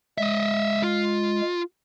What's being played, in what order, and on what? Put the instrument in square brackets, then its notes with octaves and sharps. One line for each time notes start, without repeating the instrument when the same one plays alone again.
[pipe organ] G#3 [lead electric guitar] D#5 E5
[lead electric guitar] F4